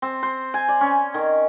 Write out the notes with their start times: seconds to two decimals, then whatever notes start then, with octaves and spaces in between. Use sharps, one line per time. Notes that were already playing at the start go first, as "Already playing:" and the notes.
0.02 C4
0.23 C5
0.54 G#5
0.69 D5
0.81 C#4
1.14 D#3